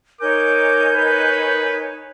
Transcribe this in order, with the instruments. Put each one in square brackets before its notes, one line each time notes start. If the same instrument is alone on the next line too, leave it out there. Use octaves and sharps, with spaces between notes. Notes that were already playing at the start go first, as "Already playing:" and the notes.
[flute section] D#4 C#5 G#5 [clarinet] A#4 [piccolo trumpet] D6 [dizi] G6
[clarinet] A#4 [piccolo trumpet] B4